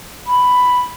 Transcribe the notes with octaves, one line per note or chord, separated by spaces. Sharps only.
B5